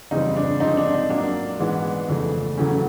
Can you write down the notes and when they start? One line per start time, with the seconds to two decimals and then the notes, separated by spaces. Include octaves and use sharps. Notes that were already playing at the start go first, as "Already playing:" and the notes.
0.11 F2 C#3 E3 G3 C4 D#4
0.36 D4
0.60 D3 F3 G#3 C4 D#4
0.77 D4
0.94 D#4
1.09 A#2 F#3 A#3 C#4 D4
1.59 G#2 E3 G#3 B3
2.08 F2 C#3 E3 A3
2.57 E2 C#3 F#3 A3 C#4